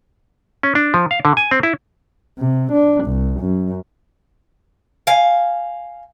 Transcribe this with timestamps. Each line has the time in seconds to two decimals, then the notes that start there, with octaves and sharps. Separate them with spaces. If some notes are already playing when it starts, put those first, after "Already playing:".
0.63 C#4
0.75 D4
0.94 F3
1.11 F5
1.25 D3
1.37 G#5
1.51 C4
1.63 E4
2.38 C3
2.72 D4
3.04 C2
3.40 F#2
5.07 F5 G#5